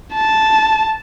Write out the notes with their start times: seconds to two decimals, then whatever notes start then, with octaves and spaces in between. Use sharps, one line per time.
0.14 A5